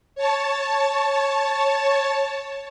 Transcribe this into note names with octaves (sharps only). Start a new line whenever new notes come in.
C#5 A5